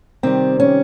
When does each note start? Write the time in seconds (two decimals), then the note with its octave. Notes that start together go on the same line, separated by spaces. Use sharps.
0.23 C3 D#3 G3 C4
0.60 C#4